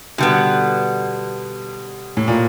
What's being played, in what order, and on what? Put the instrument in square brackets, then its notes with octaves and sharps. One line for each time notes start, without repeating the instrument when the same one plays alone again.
[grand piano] B2 [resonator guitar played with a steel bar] D3 G3 B3
[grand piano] A2
A#2